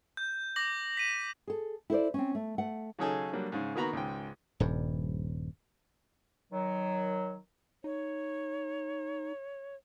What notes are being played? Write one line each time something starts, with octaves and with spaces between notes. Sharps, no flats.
G6
D6 A#6 F#7
B6 D#7
G#4 A4
E4 A4 C5 D5
C4 C#4
A3
A3 F#5
C#3 F#3 C#4 D#4 G#4 A4
F#3 G3 A#3 D4
G#2 C#3
D#3 A#3 B3 F#4 A#5 B5
C#2 G#2 G5
D#1 G2
D#3 F#3
D#4 C#5